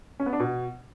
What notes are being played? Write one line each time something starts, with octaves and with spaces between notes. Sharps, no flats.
C#4
B3
D4
B2